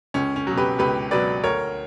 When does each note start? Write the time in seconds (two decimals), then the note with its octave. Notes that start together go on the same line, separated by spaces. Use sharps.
0.14 C#2 C#4
0.36 C#4
0.47 B2 F#3
0.57 G4 B4
0.79 C#2 G4 B4
1.11 B2 F#3 B4 D5
1.43 D2 A#4 C#5